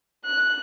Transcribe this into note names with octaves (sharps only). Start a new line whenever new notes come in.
F#6